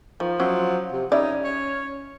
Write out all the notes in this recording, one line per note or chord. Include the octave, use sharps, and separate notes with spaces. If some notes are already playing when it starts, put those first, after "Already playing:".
D#3 F3
F#3 C#4 E4 C5
C3
G3 C#4 D#4 E4 D5
C#5